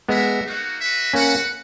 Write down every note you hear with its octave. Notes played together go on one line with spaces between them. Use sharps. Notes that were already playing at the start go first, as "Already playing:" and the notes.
G#3 B3 F#4 A#4 E5
A#3 D#4 F#4
F#4 B4 E5
A#3 C#4 F#4 B4 F#5